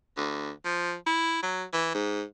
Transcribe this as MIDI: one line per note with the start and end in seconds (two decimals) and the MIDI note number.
0.17 0.50 38
0.65 0.94 53
1.06 1.42 64
1.43 1.64 54
1.73 1.91 52
1.95 2.23 44